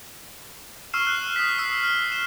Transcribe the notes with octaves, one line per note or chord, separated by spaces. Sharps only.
C#6 E6 F6 C7 E7
F#6
D#6 B6
E6 C7
F6
E7